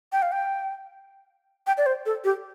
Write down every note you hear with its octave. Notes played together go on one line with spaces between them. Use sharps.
G5
F5
G5
G5
D5
C5
A4
G4